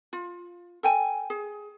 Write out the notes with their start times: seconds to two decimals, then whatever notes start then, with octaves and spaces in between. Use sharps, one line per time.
0.13 F4
0.83 A4 G5 G#5
1.30 G#4